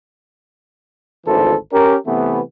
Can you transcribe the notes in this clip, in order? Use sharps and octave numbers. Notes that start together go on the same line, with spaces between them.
G#1 D2 E3 A4 C5
C#4 G4 A#4
C3 E3 A3 B3